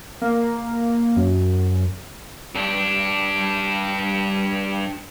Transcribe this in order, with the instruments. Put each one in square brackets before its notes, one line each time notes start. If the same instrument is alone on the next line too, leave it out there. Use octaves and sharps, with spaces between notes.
[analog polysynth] A#3
F#2
[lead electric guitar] G2 D4